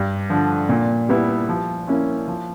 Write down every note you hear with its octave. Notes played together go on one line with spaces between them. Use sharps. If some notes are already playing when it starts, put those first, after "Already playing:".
Already playing: G2
D3 F3
A#2
G3 B3 E4
F3
A#3 C#4 E4
F3